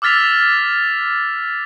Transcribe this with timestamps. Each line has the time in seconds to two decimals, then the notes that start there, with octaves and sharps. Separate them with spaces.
0.02 D6 E6 F6 A6 B6 F7